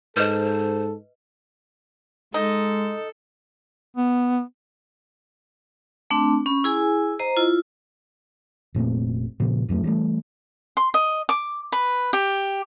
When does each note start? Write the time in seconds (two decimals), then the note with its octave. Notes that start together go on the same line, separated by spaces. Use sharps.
0.17 G#2 A4 B4 C5 D#5
2.34 G#3 D#4 A4
3.96 B3
6.11 A3 C4 D4
6.46 C#4 B5
6.64 E4 G#4 G#5
7.19 C5 D#5 A#5
7.37 E4 F4
8.74 F1 A#2 A3 C4
9.40 A#2 C#3 F3
9.69 D1 F2 F#3 A3
9.84 E3 G3 A3
10.77 C6
10.94 D#5
11.29 D6
11.72 B4
12.13 G4